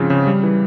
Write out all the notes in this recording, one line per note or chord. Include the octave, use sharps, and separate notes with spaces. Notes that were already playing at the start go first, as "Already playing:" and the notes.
Already playing: G#2 C#3 F3 C4
C#3
G3
E3